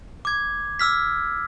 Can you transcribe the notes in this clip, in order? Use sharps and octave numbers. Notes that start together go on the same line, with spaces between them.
D6 G#6
D6 E6 F6 B6